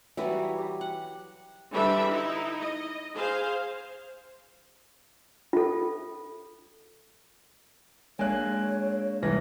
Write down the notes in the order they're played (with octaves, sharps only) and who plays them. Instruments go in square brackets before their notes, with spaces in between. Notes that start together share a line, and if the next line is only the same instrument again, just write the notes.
[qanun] E3 F#3 G3 [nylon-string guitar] F#4 B4 E5
[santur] G4
[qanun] F#5
[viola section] D3 E3 G3 D4 E5 B5
D#4 E4
D#5
G#4 C5 F5
[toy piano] F4 A4
[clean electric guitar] G#3 A#3 D4 [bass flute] C#5 [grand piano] G#5 F#6
[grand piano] C2 E3 A#6